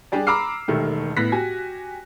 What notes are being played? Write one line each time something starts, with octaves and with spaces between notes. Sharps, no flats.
G3 D4 G4 G#4 D5
A#5 B5 D6 E6 F6 C7
E1 D#3 A3 G4
A2 B3 F#6 A#6 B6
F#4 G4 G#5